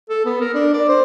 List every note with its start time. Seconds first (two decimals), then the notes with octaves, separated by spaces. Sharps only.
0.10 A4
0.25 B3
0.41 A#4
0.54 D4
0.73 D5
0.89 C5